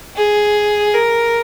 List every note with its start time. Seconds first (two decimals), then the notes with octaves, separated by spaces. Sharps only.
0.16 G#4
0.95 A#4